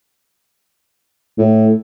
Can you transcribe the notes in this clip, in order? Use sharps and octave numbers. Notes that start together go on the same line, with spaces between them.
A2